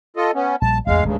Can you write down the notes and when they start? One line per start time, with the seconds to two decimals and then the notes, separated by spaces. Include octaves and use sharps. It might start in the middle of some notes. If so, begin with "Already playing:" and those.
0.16 F4 A4 D#5
0.35 B3 C#4
0.62 A#1 G3 A5
0.87 A1 E2 G#3 F5
1.05 D1 G2 C#3 G#3 A3